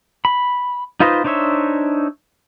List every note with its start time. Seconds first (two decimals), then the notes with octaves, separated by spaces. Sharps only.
0.25 B5
1.00 D#4 F4 B4 C5 D#5
1.24 D4 D#4 C5 C#5 E5